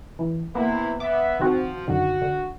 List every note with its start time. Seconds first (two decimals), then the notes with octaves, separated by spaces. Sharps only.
0.19 E3
0.55 C3 E3 A#3 B3 E4
1.00 B3 E5 D6
1.40 D#3 F3 C4 F#4
1.88 F#2 D3 D#3 F#4
2.21 D3